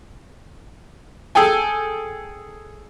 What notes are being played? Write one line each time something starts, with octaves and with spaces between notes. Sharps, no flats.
G#4 A4 G5 G#5